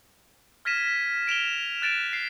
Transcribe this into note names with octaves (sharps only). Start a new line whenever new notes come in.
F6 G#6 A#6 B6 D#7 E7
D7 E7 F7 G7
F#6 A6 D7 E7
C7